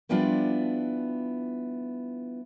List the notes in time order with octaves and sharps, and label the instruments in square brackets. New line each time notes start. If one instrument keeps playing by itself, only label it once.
[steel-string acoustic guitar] F3 G3 B3 D4 E4 F4